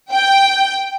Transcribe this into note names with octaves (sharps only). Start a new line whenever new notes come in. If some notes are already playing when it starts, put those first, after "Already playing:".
G5